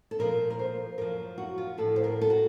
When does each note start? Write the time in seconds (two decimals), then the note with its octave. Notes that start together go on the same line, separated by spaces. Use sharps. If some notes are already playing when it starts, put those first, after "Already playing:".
0.11 A4
0.19 A#2 F3 A#4
0.50 A#4
0.59 C5
0.98 F#2 F3 A#4
1.38 F#4
1.58 F4
1.78 A2 F3 A4
1.96 C5
2.04 A#4
2.21 A4
2.30 F#4